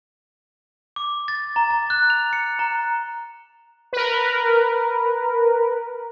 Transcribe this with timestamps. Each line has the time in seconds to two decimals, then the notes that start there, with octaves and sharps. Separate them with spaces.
0.96 D6
1.28 A6
1.56 A#5
1.71 A#5
1.90 F#6
2.10 F7
2.33 C#7
2.59 A#5
3.93 A#4 B4